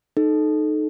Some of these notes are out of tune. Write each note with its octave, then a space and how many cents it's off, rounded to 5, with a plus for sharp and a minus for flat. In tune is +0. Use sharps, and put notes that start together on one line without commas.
D#4 -15 A4 -20